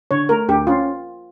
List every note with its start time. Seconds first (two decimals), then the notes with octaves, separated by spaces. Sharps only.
0.11 D3 C#5
0.29 A3 A#4
0.48 D2 G4
0.67 C#4 F4